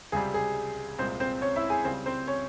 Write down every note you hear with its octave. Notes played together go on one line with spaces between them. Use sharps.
C#2 C3 G3 G#4
G#4
C2 A#2 G#3 C4 C5
C4 C5
C#4 C#5
E4 E5
G#4 G#5
C#2 C#3 G3 C4 C5
C4 C5
C#4 C#5